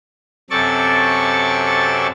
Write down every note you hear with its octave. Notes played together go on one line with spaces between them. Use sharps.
F#2 C3 A4 D5 C#6 A6